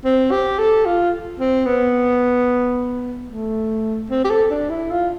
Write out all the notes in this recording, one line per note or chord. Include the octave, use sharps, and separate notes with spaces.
C4
G4
A4
F4
C4
B3
A3
C4
G4
A4
D4
E4
F4